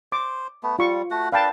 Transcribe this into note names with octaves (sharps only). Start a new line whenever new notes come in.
C5 D6
A3 B3
G3 F4 C#6
A3 F#4 F#5
D4 A4 B4 F5 G5 A5